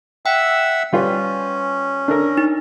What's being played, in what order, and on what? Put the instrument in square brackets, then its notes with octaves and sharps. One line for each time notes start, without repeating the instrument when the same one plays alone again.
[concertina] E5 F#5 E6 [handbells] G5
[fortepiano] G3 F4 B4 [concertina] C#4
[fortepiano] D4 A4 A#4
[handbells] D#4